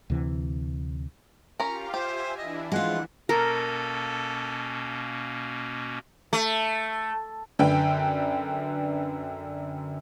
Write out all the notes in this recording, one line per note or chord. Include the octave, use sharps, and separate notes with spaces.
D2 C3 E3
C#4 F4 G4 A#4 F5 A#5
G4 C5 E5 G#5
E3 D4 E4 D#5
E3 F3 G#3 F4 F#5
B2 A#3 C#4 A4 A#4
A3
F#2 D3 B4 G5